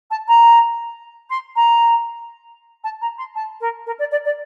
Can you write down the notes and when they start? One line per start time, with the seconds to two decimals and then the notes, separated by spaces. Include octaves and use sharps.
0.11 A5
0.28 A#5
1.30 C6
1.56 A#5
2.84 A5
3.01 A#5
3.18 C6
3.35 A5
3.60 A#4
3.86 A#4
3.99 D5
4.11 D5
4.25 D5